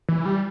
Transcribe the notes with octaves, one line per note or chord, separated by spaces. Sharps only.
E3
G3